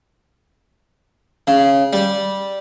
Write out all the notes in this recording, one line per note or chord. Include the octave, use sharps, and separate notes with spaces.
C#3
G3